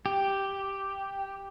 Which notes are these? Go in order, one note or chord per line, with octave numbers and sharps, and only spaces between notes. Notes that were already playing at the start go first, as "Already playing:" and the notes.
G4